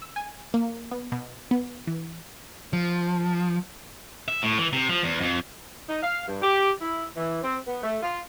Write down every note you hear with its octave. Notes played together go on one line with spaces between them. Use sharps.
E6
G#5
A#3
B3
B2
B3
E3
F3
E5
A2
E3
C3
F3
E2
F2
D#4
F5
G2
G4
E4
E3
C4
B3
A3
F4